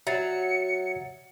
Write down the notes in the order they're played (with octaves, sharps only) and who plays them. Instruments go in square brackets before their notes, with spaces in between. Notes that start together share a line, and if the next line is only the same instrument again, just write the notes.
[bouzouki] F#3 [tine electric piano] E5 A6 C7 [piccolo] C#7